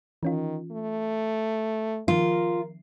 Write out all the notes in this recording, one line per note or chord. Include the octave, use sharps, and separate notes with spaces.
D#3 E3 C#4 F4
A3
D#3 F3 F4 A#4